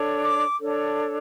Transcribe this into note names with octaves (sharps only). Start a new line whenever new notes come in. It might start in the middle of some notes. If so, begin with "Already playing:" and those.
Already playing: D4 A4 C#5
D6
D4 A4 C#5